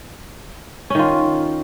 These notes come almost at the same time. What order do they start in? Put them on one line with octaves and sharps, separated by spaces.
C#4 D#3 F4